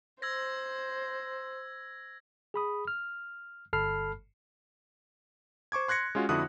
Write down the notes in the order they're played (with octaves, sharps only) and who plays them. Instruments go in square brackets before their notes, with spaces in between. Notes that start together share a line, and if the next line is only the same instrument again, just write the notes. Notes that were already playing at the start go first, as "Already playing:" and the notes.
[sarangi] C5 [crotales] E6 G#6 A#6
[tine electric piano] G#4 B5 D#6
F6
G1 A4 A5 B5 F6 C7
[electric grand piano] C5 C#6 D6 G#6
C6 F#6 G#6 A#6 C#7
G#3 C#4 F4 F#4
F2 D3 E4 F#4 D#6 F#6